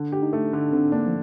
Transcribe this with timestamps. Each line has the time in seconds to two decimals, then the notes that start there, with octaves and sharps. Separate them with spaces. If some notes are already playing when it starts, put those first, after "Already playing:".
Already playing: D3 D4
0.12 G4
0.22 D#4
0.33 A3
0.53 D3 D4
0.72 D3 C4
0.92 A#3 D4
1.07 F3